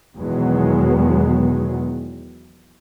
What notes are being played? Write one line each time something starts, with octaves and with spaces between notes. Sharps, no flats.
E2 B2 D#3 F#3 G#3 B3